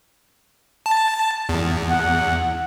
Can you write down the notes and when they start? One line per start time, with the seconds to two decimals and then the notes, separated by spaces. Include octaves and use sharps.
0.86 A5
1.49 E2
1.90 F#5